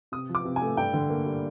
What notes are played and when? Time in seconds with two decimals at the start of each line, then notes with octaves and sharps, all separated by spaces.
0.12 C3 D#6
0.29 F3
0.35 D6
0.45 C3
0.56 G#5
0.62 A3
0.77 G2 G5
0.94 D3
1.09 A#3
1.26 G3